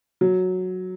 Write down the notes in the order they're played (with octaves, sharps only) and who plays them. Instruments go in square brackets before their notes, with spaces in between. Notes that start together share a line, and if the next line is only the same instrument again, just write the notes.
[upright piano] F#3